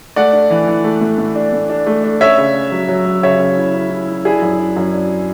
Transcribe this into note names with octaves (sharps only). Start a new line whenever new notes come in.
A3 D5 F#5
D4
E3
E3
A3
A2
A2
D4
A2
D4
A3
D4
C#4 C#5 E5
C#3
C#4
F#3
F#3
F#3
C#3 C#5 E5
C#3
E4
C#4
E4
E4
D4 E4 G#4
F#2
D4
F#2
D4